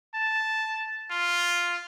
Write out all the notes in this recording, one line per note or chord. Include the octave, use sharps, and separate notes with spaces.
A5
F4